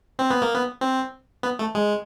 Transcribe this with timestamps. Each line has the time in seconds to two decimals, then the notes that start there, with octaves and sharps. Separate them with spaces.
0.19 C4
0.31 B3
0.42 A#3
0.54 B3
0.81 C4
1.43 B3
1.59 A3
1.75 G#3